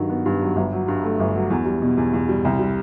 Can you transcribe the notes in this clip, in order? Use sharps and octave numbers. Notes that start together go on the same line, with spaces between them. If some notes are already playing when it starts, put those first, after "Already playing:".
Already playing: G2 D#3 F#3
B3
G2
F#3
G1
F#3
G2
A3
G1
F#3
E2
G3
B2
E2
E2
G3
C2
G3